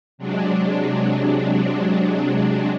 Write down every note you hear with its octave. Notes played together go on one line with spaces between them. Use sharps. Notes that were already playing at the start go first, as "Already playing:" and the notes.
C3 F#3 G#3 D4